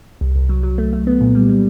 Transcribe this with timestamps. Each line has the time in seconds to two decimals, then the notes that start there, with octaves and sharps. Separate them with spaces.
0.21 C2
0.36 C2
0.49 F#3
0.63 F#3
0.78 A3
0.93 A3
1.07 B3
1.21 A#2
1.35 G3
1.49 G3